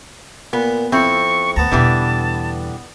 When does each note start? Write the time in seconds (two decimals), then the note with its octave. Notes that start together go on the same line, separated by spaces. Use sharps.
0.53 A#2 B3
0.92 F2 C4 E4 C#6
1.56 D2 B3 A5 A#5
1.72 E2 B2 D3 E3 G3